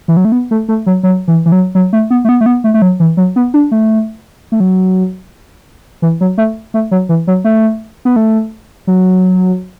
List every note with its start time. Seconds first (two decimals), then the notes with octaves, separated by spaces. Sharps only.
0.08 E3
0.17 F#3
0.25 A3
0.32 B3
0.51 A3
0.69 A3
0.86 F#3
1.03 F#3
1.28 E3
1.46 E3
1.52 F#3
1.75 F#3
1.93 A3
2.10 B3
2.25 A3
2.29 B3
2.41 A3
2.46 B3
2.64 A3
2.74 A3
2.82 F#3
3.00 E3
3.17 F#3
3.36 B3
3.54 D4
3.72 A3
4.52 A3
4.60 F#3
6.02 E3
6.21 F#3
6.38 A3
6.74 A3
6.91 F#3
7.09 E3
7.27 F#3
7.44 A3
8.05 B3
8.16 A3
8.87 F#3